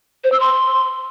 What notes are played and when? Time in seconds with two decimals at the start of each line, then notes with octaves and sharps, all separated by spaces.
0.24 C5
0.32 E6
0.40 C6